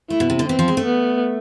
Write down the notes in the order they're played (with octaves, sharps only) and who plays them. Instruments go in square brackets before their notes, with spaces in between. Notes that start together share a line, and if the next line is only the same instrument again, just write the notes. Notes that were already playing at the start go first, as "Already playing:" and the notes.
[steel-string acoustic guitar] A3 [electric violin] E4
[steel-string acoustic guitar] B2
C3
D3
[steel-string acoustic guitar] E3 [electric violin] C4
[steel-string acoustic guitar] F3
G#3
A3
[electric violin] B3